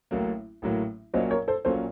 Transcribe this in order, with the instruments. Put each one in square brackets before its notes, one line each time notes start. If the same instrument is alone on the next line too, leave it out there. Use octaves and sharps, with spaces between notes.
[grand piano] A1 A2 F#3 A#3
A1 A2 F#3 A#3
[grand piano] A#1 A#2 F#3 A#3 C#4 [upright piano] C5 D#5
[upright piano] A#4 C#5
A4 C5
[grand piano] A#1 A#2 F#3 A#3 C#4 [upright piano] A4 C5